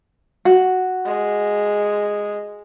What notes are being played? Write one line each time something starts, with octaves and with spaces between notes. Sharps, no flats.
F#4
G#3